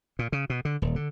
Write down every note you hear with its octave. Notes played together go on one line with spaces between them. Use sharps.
A#2
C#3
B2
D3
D#1
D3